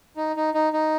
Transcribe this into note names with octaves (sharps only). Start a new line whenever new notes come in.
D#4
D#4
D#4
D#4